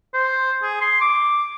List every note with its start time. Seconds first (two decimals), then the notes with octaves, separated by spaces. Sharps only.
0.14 C5
0.63 G#4
0.81 C6
1.01 D6